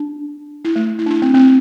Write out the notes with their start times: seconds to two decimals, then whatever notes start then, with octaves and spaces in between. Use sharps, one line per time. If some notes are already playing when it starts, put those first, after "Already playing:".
Already playing: D4
0.65 E4
0.76 A3
0.99 E4
1.06 D4
1.10 E4
1.22 C4
1.34 C4